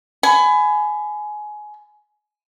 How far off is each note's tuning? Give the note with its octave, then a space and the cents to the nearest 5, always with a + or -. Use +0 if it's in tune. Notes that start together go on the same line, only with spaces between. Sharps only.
G#5 +20 B5 +25